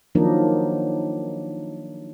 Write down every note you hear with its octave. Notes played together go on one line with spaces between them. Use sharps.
D#3 F3 F#3 A#3 D4 D#4